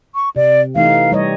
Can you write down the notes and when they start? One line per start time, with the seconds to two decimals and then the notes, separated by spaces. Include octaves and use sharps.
0.15 C#6
0.36 C3 D5
0.75 E3 A3 D#4 F5
1.12 G3 C#5 D#5